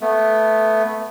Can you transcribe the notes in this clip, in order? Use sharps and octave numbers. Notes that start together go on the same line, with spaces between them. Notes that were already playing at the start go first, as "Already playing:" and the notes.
A3 B3